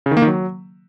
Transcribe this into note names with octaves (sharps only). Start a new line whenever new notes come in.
C#3
D#3
A#3
D#3
F#3